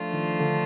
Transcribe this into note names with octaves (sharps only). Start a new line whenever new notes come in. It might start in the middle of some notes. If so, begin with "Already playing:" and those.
Already playing: F3 A3 D4 F4
D#3
D3